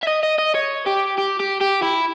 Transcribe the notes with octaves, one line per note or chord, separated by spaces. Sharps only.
E5
D#5
D#5
D#5
C#5
G4
G4
G4
G4
E4